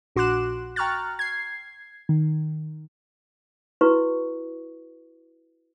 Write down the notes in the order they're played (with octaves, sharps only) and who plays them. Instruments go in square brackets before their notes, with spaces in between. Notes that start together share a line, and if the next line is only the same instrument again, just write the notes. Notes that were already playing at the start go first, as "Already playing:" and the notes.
[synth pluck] A#1 F#4 C6 D6 F#6 E7
G5 A#5 C#6 F6 F#6 A6
G#6 C7
D#3
[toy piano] E4 F#4 B4 C#6